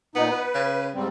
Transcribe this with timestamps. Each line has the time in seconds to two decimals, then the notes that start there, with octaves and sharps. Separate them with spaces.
0.15 A#2 B3 D#4
0.30 B4
0.54 C#3
0.95 G#2 G3 C4